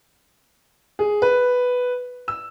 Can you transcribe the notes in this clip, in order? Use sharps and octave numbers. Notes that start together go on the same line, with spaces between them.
G#4
B4
E6